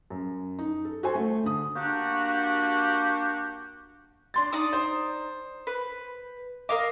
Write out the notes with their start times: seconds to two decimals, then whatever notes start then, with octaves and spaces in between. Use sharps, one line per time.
0.10 F#2
0.59 D#4
0.85 A4
1.03 F#4 A4 C5 G#5
1.15 A3
1.43 D3 D#6
1.76 A#3 D4 F#4 G4
4.34 D4 C6 A6
4.53 D#4 D5 D#6
4.73 C5
5.67 B4
6.69 A#4 D#5 F5 D6